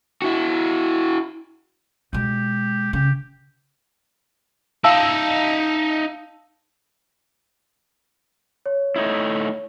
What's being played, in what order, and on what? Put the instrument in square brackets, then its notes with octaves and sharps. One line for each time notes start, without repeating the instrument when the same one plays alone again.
[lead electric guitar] E4 F#4
[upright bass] B2 G#3 [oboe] G4
[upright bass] C#3 [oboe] G4
[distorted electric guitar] D#4 E5 [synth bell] F5 A5 E6
[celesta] C#5
[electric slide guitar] A3 D#4 E4